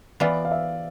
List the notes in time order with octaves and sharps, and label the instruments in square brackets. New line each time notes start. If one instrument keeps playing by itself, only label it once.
[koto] E3 B3 F4 [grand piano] D5
[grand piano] F5
E5